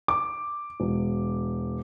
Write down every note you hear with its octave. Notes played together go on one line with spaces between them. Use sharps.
D6
E1